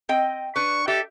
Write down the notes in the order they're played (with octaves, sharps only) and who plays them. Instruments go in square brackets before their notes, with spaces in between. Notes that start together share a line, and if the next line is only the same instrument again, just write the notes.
[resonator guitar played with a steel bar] C4 D#5 G5
[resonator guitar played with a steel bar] D4 B4 [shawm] C#6
[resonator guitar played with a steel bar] G4 E5 [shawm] A4